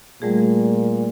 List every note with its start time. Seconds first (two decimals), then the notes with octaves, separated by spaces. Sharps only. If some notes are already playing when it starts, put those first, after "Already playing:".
0.22 A#2 G3 A3 G#4